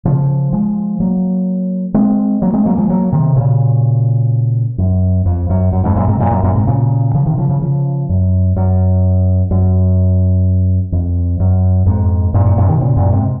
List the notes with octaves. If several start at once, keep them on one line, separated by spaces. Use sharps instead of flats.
C#3 F3
F3 G#3
F#3 A#3
G#3 C4
F#3 A#3
G#3 C4
F#3 A#3
F3 G#3
F#3 A#3
C3 D#3
A#2 C#3
F#2
F2
F#2
F#2
F2 G#2
F#2 A#2
G#2 C3
F#2 A#2
F#2
F#2 A#2
G#2 C3
A#2 C#3
C#3 F3
C3 D#3
C#3 F3
C#3 F3
C#3 F3
F#2
F#2
F#2
F2
F#2
F2 G#2
F#2 A#2
F#2 A#2
F#2 A#2
C3 D#3
A#2 C#3
F#2 A#2
G#2 C3